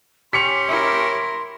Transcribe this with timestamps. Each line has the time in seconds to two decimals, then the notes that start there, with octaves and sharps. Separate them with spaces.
0.33 C#4 G4 C6 B6 C#7 F7
0.68 E4 A#4